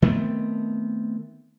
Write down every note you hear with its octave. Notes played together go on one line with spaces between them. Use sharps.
D#3 A3 B3 C4